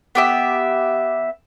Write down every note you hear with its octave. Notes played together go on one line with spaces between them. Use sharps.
B3 G4 E5